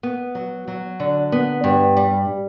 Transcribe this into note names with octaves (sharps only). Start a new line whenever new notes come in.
B3
F#3
F#3
D3
B3
G2
G3